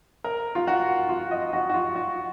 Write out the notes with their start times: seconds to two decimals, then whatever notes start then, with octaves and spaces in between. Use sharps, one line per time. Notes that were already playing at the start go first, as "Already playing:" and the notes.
0.24 A#4
0.55 F4
0.67 F#4
1.09 F4
1.31 D#5
1.53 F#4
1.69 F#4
1.74 F4
1.95 F#4